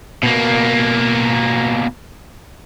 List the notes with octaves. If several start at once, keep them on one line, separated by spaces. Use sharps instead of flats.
B2 A#3